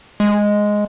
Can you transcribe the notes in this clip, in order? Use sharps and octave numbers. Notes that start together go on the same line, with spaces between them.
G#3